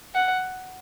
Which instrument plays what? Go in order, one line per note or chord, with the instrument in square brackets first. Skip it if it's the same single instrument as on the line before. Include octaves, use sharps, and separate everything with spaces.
[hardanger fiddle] F#5